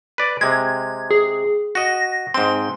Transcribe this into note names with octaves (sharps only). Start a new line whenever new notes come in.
B4 D5
C3 G#3 G#6
G#4
F#4 D#5 A#6
G#2 C4 C6